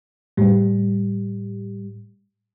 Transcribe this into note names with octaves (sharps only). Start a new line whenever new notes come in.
A2 G3